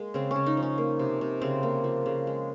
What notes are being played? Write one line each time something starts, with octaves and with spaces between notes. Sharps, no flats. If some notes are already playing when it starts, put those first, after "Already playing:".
Already playing: G#3 A#3
C#3 C4
C#4
C#3
D#4
F3
C#4
A#3
C3
C3
C#3 C4
A#3
F3
C#3
G#3